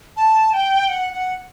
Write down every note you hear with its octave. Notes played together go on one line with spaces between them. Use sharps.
A5
G5
F#5
F#5